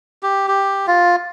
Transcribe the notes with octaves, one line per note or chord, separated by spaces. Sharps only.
G4
G4
F4